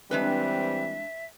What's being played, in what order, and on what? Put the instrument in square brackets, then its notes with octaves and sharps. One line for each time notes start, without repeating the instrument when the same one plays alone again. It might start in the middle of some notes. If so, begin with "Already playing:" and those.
[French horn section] E3 G3 C4 [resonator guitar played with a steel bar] G#3 D4 B4 [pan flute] E5